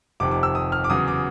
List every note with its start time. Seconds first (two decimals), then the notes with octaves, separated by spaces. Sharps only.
0.20 F1 F2 C3 D#3 D6
0.31 D6
0.43 E6
0.55 D#6
0.72 F6
0.84 D6
0.90 E2 C#3 F#3 D#6
1.08 D6